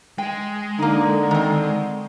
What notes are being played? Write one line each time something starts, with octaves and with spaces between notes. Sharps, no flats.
G#3 G5
D3 A#3 D#4
D#3 C4